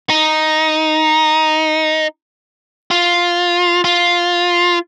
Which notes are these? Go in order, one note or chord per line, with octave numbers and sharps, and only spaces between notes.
D#4
F4
F4